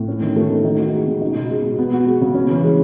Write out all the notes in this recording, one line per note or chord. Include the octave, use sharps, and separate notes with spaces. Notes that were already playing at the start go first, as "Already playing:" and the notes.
Already playing: A2
C#4
D#3
A3
D#3
D#4
F#4
G#3
C#3
D#4
B2
G#3
B2
B3
F#4
G#3
C#3
C#4
E3
G#3